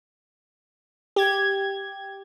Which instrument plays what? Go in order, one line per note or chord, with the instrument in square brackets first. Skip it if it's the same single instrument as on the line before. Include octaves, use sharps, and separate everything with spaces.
[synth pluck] G4 G#6